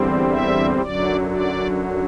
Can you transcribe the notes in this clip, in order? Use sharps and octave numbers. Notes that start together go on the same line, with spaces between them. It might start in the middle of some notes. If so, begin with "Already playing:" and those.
Already playing: E2 D3 G3 C4
E5
F#2 D3 F#3 D5
D5